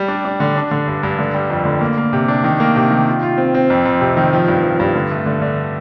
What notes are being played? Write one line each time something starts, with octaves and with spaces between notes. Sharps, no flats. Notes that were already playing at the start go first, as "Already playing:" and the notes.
Already playing: G3
D4
D4
D3
D4
D3
G2
G2
D3
G3
F2
D3
A#3
A#3
C3
D4
D#3
A#3
C3
D#3
F4
F4
C4
C4
F2
F2
C3
D#3
F3
G2
F3
G2
D3
A3
D3
D3